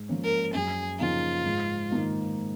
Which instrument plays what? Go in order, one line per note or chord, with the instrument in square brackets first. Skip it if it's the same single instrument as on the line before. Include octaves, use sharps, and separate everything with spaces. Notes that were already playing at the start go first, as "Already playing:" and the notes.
Already playing: [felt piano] G#2
F3 A#3 C#4
[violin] A#4
[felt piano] F#2 [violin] G#4
[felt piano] C#3 F3 A#3 D#4 [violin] F4
[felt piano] G#2
D#3 A#3 D#4